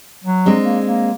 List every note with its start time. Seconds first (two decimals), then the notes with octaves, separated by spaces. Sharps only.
0.24 F#3
0.46 G#3 C4 D4
0.65 A#3
0.85 A#3